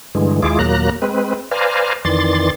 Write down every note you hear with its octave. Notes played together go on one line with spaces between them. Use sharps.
G2 D3 E3 G#3
D#2 G#3 E4 F4 G#4 D6
D#2 A#2 F#3 A#3 A#5 F#6
G#3 C4 B4
B4 C5 D5 F5 G#5 A#5
F2 D#3 E3 D5 C6 A6